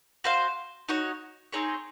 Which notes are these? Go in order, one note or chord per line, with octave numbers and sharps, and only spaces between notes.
F#4 C5 F5
D#4 F#4 C#5
C4 D#4 G#4 C#5